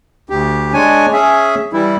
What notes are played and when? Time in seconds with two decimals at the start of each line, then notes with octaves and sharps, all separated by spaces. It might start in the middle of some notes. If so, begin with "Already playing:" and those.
0.30 D2 G4
0.74 G#3 D4 C#5 G#5
1.13 C#4 G#4 E5
1.73 E3 G3 E4